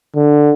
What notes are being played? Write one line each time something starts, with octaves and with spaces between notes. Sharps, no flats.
D3